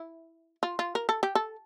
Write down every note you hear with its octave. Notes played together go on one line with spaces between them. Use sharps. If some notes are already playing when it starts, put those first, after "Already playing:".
Already playing: E4
F4
F4
A#4
A4
G4
A4